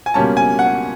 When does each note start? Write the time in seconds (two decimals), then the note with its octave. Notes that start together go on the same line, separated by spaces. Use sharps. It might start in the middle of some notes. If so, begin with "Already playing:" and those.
0.06 G#5
0.14 C#2 B2 G3 A#3 C#4 A5
0.37 G#5
0.59 F#5